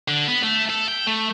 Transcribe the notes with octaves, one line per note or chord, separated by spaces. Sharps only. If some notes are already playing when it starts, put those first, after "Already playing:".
D3
B3
A3
A4
G5
A3